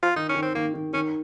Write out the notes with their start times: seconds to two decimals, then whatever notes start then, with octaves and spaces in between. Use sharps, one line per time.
0.03 F4
0.16 D#3 D#4
0.29 C#4
0.35 D#3
0.42 C4
0.55 D#3 A#3
0.74 D#3
0.93 D#3 C#4